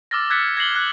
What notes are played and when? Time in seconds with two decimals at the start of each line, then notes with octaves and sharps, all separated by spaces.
0.11 D6 E6 F6 A6 A#6
0.30 E6 F#6 G#6 A6 B6 C#7
0.57 G#6 A#6 C7 F#7 G7
0.75 F#6 G#6